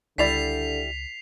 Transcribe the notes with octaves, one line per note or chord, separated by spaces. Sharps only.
C#2 D3 G3 E4 D5 B6 C7 F7